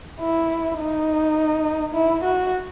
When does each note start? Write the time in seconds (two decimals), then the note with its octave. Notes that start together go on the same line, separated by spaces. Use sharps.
0.20 E4
0.79 D#4
1.94 E4
2.24 F#4